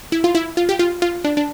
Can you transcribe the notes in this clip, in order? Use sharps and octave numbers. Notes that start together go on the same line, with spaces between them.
E4
F4
E4
F4
G4
F4
F4
D4
D4